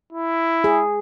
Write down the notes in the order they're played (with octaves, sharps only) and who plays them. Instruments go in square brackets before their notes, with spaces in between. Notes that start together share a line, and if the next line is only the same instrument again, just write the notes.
[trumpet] E4
[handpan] G#4